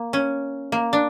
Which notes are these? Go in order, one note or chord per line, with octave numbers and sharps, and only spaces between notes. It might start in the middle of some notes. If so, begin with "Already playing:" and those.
Already playing: A#3
C#4
A#3
D4